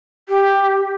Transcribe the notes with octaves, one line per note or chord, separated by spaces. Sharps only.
G4